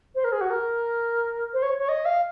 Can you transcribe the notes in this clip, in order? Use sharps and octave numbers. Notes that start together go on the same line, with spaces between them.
C5
A#4
G#4
F#4
A#4
C5
C#5
C#5
D#5
F5